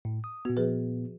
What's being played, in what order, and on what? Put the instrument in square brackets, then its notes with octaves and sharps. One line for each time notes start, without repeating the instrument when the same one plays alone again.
[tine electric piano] A2
D#6
[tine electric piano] A#2 B3 [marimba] F#4
[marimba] F3 G#4 B4